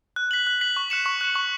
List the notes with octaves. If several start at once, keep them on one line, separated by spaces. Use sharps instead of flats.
F#6
B6 F#7
F#6
B6 F#7
C#6
F#6 C#7 E7
C#6
F#6 C#7 E7
C#6